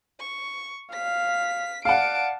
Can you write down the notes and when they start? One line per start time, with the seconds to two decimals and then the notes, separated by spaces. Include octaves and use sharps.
0.20 C#6
0.93 F5 B6
1.85 D5 F5 F#5 A5 D7